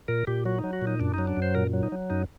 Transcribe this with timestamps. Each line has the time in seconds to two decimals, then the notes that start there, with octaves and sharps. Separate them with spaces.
0.08 A#2 A#4
0.27 A#2 G4
0.45 F#3 F#4
0.58 D#4
0.64 F#3
0.73 F#4
0.82 A#2
0.87 D#4
1.00 F#2 D4
1.14 F#3 D#4
1.27 D4
1.37 F#2
1.42 C5
1.55 A#2 A#4
1.73 F#3
1.83 D#4
1.92 F#3
2.10 F#2 D#4